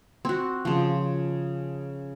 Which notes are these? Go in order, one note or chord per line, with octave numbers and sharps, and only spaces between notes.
C4 F#4
C#3 F3